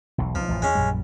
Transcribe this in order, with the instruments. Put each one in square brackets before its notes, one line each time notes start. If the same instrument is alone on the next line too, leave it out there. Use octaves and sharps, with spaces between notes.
[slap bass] E1 B1
[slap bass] B1 [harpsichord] F3
[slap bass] A1 F2
[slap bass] E2 [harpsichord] G#3 C#4
[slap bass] A#1 F#2 G3